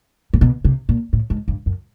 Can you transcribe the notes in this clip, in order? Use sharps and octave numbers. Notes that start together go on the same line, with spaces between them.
A#2
B2
C3
A#2
A2
G#2
G2
F#2